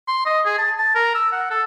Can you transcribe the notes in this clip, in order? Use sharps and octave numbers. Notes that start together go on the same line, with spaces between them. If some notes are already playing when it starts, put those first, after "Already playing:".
C6
D#5
G#4
A5
A5
A#4
E6
F#5
A4